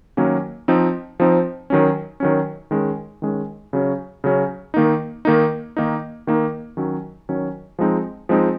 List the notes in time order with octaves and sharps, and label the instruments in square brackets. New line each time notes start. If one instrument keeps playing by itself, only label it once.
[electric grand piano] D#3 F#3 A#3 C#4
F3 C4 D#4
F3 C4 D#4
D#3 F#3 C#4
D#3 F#3 C#4
D#3 G#3 C#4
D#3 G#3 C#4
C#3 F#3 C#4
C#3 F#3 C#4
D#3 A#3 D#4
D#3 A#3 D#4
D#3 A#3 D#4
D#3 A#3 D#4
D#3 F#3 C#4
D#3 F#3 C#4
F3 G#3 C4 D#4
F3 G#3 C4 D#4